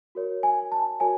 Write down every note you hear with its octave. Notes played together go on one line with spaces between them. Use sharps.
F#4 A#4 C#5
G#5
A5
F#4 A#4 C#5 G#5